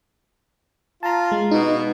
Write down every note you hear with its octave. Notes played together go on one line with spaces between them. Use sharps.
F4 A5 A#5
G#3
B2 D#4